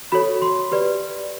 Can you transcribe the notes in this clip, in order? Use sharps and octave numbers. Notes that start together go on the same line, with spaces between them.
F#4 A4 C#5 B5
C6
G4 B4 D5